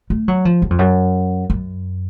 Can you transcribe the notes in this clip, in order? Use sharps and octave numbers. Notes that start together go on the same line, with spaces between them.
A3
F#3
F3
F#2
F2
F#2
F#2